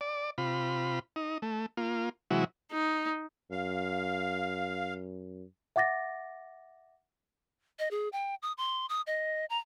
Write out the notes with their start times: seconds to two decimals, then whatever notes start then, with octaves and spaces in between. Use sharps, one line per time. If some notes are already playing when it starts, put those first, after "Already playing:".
0.01 D5
0.38 C3 F4 B5
1.16 D#4
1.42 A3
1.77 A#3 F4
2.31 C3 E3 F#3 G#3 E4 F#4
2.72 D#4
3.51 F#2 F5
5.76 E5 F#5 D6 A6 A#6
7.79 D#5
7.91 G#4
8.12 G5
8.42 D#6
8.58 C6
8.89 D#6
9.07 D#5
9.50 A#5